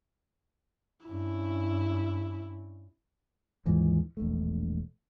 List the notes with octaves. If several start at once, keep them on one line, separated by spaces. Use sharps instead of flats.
G2 C#4 E4
D#2 G#2 E3 F3
E1 A#1 A3